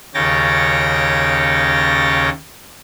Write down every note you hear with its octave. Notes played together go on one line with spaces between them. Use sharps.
D#2 C#3 C#5 G5 A6 A#6